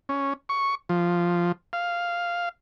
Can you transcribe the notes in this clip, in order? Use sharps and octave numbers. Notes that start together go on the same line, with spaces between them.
C#4
C#6
F3
F5